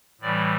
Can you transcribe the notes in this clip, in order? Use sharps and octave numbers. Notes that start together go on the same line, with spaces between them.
A2 E3 G3 D5